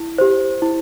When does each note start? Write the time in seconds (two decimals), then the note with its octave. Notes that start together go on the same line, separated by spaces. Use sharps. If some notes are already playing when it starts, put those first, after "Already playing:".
Already playing: E4
0.18 G4 C5
0.62 E4